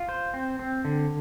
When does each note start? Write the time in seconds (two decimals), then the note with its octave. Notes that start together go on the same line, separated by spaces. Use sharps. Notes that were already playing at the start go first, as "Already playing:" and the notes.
Already playing: F4
0.09 C5
0.34 C4
0.59 C4
0.85 D3